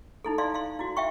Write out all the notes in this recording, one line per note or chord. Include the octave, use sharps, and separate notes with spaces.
D#4 E4 A4
E4 D5 F5 C6
F5 C6
E4 F#4
E5 F5 G5 C#6